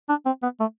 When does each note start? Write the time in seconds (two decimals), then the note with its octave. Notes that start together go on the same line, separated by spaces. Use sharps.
0.09 D4
0.26 C4
0.43 B3
0.60 A3